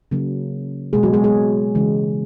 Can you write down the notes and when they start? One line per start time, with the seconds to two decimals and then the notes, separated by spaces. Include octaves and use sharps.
0.11 C#3 F#3 A#3
0.93 B2 G#3 A#3 G#4
1.03 F#3 F#4
1.13 G#3 G#4
1.24 G#3 G#4
1.75 C#3 E3 G#3